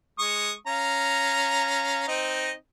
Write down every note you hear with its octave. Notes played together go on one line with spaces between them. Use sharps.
G#3 C#6 D#6
C#4 F5 A#5
C4 D#4 D#5